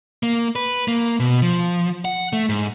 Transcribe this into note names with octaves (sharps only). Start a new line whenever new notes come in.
A#3
B4
A#3
B2
F3
F#5
A3
G#2